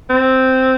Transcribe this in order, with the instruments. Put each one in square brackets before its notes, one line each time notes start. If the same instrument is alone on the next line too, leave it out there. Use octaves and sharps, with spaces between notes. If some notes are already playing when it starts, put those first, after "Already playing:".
[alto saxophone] C4